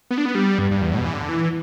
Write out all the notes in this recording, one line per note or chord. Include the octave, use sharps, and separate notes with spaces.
B3
D4
B3
G3
G2
G2
E2
A2
B2
E3
D3
E3